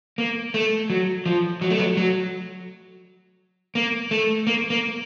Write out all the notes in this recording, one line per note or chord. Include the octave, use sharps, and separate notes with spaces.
A#3
A3
F#3
F3
F#3
A3
F#3
F#3
A#3
A3
A#3
A#3